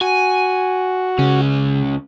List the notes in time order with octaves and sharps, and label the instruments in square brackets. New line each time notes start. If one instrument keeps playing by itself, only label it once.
[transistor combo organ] F#4 [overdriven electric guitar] G#5
[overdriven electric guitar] C#2 C#4 [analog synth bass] C#3